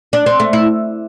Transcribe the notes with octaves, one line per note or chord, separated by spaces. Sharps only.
D4
C4
A3
E4